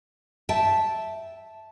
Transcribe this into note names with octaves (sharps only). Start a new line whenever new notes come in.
E5 G5 A5